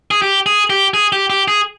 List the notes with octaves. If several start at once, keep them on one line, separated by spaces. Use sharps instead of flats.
G#4
G4
G#4
G4
G#4
G4
G4
G#4